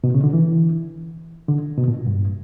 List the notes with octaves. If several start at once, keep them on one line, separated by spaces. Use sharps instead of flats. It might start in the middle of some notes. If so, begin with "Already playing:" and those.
B2
C#3
D3
E3
D3
B2
A#2
G2